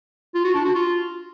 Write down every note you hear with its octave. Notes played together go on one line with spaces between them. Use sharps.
F4
F#4
D4
F#4
F4